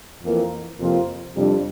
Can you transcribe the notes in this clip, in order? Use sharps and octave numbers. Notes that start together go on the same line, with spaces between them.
F2 E3 A#3
F2 C3 F3 A#3 F4
F2 C3 G3 D4